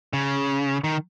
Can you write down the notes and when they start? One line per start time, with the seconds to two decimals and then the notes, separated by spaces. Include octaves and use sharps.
0.13 C#3
0.84 D#3